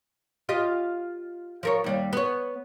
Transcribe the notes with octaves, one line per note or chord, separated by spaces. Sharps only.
F4 G4 D#5
F3 A#4 C#5
D#2 G3 F5
B3 C#5